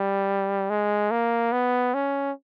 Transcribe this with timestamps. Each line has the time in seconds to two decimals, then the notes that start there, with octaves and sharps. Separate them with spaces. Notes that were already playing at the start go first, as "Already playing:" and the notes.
Already playing: G3
0.70 G#3
1.11 A#3
1.52 B3
1.94 C#4